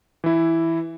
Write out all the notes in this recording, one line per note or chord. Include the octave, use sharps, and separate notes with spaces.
E3 E4